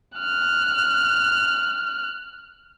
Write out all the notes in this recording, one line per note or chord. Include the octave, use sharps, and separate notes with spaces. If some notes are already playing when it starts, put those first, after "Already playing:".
F6 F#6